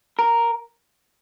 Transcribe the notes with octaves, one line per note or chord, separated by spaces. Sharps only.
A#4